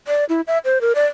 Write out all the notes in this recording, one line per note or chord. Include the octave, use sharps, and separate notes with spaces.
D5
E4
E5
C5
A#4
D5